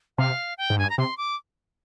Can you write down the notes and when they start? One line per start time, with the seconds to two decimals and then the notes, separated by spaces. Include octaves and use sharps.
0.18 C3 F5
0.58 G5
0.70 G#2
0.78 G2 G#5
0.90 A#5
0.98 C3 C6
1.17 D6